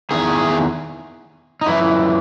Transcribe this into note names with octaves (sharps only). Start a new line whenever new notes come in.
E2 D#3 G#4
D#4
F#2 E3 E4